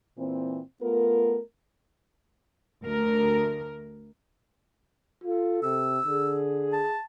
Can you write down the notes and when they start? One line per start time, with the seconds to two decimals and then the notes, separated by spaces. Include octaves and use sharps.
0.18 A#2 E3 C4
0.82 A3 B3 F4 A#4
2.84 D2 A#4
5.24 F4 A4
5.63 C3 E6
6.06 D3 G#4
6.73 A5